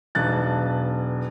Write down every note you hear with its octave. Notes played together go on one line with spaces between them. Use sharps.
E1 B1 F#6 A6